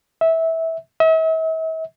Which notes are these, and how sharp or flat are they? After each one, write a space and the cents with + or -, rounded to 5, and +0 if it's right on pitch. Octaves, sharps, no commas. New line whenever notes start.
E5 -20
E5 -45